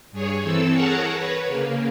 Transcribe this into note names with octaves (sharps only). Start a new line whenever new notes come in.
G2 G#4 C#5
E3 C4 A4 E6
G#4 A#4 C#5 F#5 A5 A#5
B4 C#5
C#3 A#3